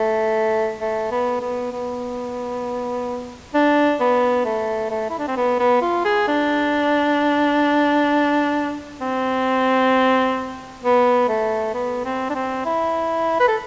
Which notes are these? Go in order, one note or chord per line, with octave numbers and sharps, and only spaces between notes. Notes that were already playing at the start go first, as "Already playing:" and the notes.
Already playing: A3
A3
B3
B3
B3
D4
B3
A3
A3
E4
D4
C4
B3
B3
F4
G#4
D4
C4
B3
A3
B3
C4
D4
C4
E4
B4
A4